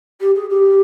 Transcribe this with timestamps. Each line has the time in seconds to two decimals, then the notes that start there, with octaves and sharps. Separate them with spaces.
0.20 G4
0.35 G#4
0.50 G4